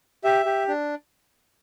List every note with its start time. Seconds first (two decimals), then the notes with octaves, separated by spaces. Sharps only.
0.24 G4 E5
0.46 G4
0.68 D4